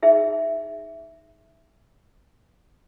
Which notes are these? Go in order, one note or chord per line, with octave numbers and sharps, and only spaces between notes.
D#4 G#4 E5